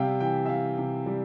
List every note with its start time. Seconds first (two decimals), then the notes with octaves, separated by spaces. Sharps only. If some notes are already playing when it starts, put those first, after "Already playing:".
Already playing: C3 G3 E5 F5 G5
0.20 E3 G5
0.46 E5
0.49 E3 F5
0.78 C3
1.06 G3